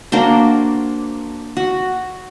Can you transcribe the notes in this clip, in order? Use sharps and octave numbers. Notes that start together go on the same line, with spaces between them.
A#3 D4 F#4 C5
F#4